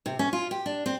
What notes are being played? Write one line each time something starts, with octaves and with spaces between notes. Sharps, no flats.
C3
C#4
F4
G4
D4
C4